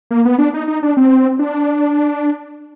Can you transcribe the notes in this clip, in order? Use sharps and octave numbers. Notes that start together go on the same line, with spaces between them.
A#3
B3
D4
D#4
D#4
D4
C4
D4